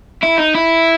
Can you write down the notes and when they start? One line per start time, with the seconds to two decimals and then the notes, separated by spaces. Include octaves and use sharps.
0.23 E4
0.38 D#4
0.55 E4